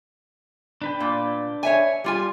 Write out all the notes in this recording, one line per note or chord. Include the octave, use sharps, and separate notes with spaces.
D4 B4 G5
A#2
C#5 E5 G#5
G3 F4 G#5